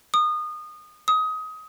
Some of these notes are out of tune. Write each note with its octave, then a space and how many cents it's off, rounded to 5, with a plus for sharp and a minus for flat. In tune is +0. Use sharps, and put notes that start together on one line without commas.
D#6 -25
D#6 +20